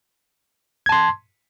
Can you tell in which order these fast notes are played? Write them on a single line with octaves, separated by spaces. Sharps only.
G#6 A5 C6